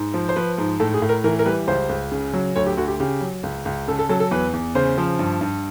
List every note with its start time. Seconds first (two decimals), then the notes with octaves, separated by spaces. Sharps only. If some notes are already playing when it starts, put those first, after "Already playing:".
Already playing: G#2
0.14 F3
0.29 C5
0.36 F3 B4
0.58 G#2
0.80 A2 A4
0.94 G#4
1.02 A2
1.09 A#4
1.24 E3 A#4
1.39 A#4
1.45 G3 B4
1.67 C#2 C5
1.89 C#2
2.12 C#3
2.34 F#3
2.56 D2 C#5
2.66 G4
2.77 D2 F#4
2.88 G4
3.00 C#3 G4
3.21 F#3
3.43 C#2
3.65 C#2
3.88 C#3 A4
3.99 A4
4.09 F#3 A4
4.20 A4
4.31 E2 B4
4.53 E2
4.75 C#3 C5
4.98 F3
5.19 G2
5.41 G2